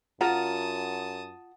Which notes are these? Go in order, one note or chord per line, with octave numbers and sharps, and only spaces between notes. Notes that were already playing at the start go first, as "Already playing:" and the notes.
F#2 F4 F#5 A5 A#5 D#6